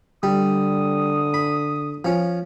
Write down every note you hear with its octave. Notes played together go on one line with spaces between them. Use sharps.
D3 G3 D#6
B5
F3 C#4